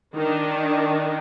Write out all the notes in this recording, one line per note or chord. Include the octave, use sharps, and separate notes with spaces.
D#3 D4